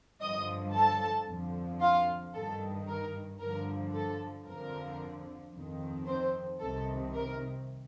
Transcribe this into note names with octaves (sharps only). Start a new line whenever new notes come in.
G2 D3 F3 D#5 D#6
A4 A5
F2 D3 F3
F4 F5
G2 D#3 A4
A#4
G2 D3 F3 A#4
A4
F2 D3 F3 A#4
F2 D#3
C4 C5
C2 C3 D#3 A4
A#4